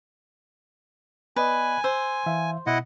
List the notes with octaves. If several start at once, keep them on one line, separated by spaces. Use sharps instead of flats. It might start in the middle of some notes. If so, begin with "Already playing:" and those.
B3 B4 D5 D#5 G#5
C5 E6
E3 E5 F5
B2 E4 D#5 F#5